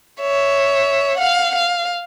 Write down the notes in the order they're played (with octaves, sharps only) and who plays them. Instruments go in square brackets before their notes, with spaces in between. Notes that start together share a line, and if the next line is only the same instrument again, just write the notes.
[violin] C#5 E5
F5 F#5
F5